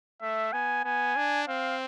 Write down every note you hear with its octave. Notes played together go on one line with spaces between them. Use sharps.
A3 E5
B3 G#5
B3 G#5
D4
C4 F5